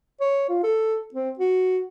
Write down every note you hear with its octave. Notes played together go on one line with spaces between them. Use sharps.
C#5
F4
A4
C4
F#4